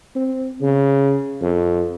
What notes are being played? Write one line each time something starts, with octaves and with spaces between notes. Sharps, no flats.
C4
C#3
F2